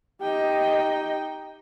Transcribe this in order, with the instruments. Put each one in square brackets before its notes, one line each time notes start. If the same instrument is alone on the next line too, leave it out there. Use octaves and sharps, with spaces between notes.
[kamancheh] D#4 G5 [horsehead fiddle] G4 D#5